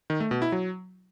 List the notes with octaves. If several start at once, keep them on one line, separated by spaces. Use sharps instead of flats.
D#3
A3
B2
E4
F#3